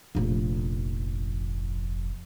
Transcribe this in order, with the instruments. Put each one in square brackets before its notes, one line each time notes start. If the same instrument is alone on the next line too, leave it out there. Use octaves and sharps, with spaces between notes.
[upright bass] F1 A#1